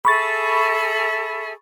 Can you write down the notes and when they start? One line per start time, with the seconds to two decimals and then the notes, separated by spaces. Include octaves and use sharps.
0.05 G#4 A4 E5 B5 C#6 A6